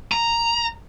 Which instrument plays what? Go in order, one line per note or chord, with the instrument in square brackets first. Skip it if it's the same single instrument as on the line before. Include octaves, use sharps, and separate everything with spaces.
[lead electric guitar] A#5